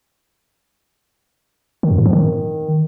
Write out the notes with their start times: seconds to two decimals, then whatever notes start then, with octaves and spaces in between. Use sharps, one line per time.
1.83 D#3
1.91 F#2
1.98 A2
2.06 F3
2.13 D#3